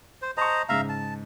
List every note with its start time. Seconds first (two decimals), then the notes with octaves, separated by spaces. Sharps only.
0.22 C5
0.37 C5 D#5 A5 A#5 C#6
0.69 G#2 C#3 E5 F5 A#5
0.89 A5